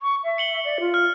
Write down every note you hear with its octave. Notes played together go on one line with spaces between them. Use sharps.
C#6
E5
C#7 F#7 G7
D5
F4
F6